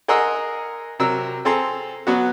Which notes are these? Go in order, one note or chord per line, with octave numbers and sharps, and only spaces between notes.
G#4 A#4 D#5 F#5 C6 E6
C3 F#3 A#4 E6
C4 G#4 A4 A#5 C6
F#3 B3 F#4